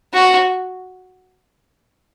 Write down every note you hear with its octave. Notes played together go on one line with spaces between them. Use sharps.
F#4